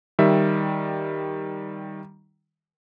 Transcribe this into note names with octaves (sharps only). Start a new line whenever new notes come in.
D#3 G3 E5